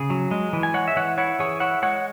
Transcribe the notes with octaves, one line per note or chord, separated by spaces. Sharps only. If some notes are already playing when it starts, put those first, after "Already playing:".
Already playing: C#3 G#4
F#3
G#3
E3
G#5
G#3 C#5 F#5
E5
E3 C#5 F#5
E4 C#5 F#5
E3 G#4 C#5
E4 C#5 F#5
G#3 C#5 F#5